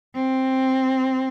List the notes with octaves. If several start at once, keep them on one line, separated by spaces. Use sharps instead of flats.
C4